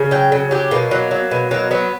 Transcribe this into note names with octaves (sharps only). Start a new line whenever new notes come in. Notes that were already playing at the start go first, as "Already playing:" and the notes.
Already playing: C#3
F#3 G5
C#3
F#3 G4
B2 A#3
F#3
F#3
B2
F#3 A#3
F#3 B3